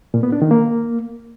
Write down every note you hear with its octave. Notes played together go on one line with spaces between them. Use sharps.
A#2
B3
D4
D#3
A#3